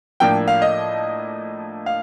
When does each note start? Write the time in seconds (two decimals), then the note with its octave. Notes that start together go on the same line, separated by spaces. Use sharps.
0.20 A2 F3 A#3 D4 G5
0.48 F5
0.62 D#5
1.86 F5